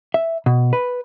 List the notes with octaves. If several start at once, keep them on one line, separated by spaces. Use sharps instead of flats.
E5
B2
B4